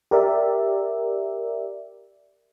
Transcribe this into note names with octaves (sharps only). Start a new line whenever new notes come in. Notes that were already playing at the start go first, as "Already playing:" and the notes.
G4 A#4 D5 E5